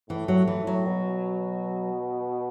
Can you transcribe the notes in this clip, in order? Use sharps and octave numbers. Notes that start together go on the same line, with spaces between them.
A2 E3
F#3
E3
F#3
B2